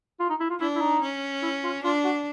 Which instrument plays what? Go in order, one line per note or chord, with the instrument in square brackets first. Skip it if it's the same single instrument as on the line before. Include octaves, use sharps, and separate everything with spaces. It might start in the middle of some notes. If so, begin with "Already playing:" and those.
[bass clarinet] F4
D#4
E4
F4
[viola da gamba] D4 [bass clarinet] E4
[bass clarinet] E4
D#4
[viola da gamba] C#4
[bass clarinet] E4
F4
[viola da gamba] D4 [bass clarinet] F4
[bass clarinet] F#4